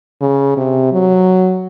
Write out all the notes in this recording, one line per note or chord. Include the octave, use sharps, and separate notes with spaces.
C#3
C3
F#3